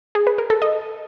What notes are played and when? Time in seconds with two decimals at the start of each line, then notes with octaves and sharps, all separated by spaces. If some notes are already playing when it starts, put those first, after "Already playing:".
0.15 G#4
0.27 B4
0.38 A#4
0.50 A4
0.62 D#5